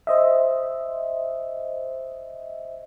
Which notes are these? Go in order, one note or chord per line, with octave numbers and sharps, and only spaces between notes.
C5 D#5 E5